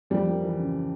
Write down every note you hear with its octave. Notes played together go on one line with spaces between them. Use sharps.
F2 G3
A#3
E3
C#3